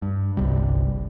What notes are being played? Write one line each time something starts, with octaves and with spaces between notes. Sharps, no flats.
G2
G1 C2 C3 G3